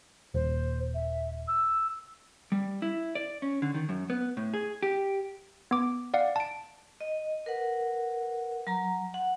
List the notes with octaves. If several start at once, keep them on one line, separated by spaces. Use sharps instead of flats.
D#1 C5
E5
E6
G3
E4
D5
C#4
D3
D#3
F#2
B3
A2
G#4
G4
B3 D6
D5 F5 F#5
A5 D7
D#5
A#4 B4 F#5
F#3 A#5
F#5